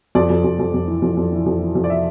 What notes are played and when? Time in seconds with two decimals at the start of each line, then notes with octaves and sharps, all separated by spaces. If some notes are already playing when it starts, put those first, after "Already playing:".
0.15 F2 D5
0.30 F2
0.44 F2
0.59 F2
0.74 F2
0.88 E3
1.02 F2
1.17 F2
1.32 E3
1.46 F2
1.60 E3
1.75 F2
1.84 D5
1.90 E5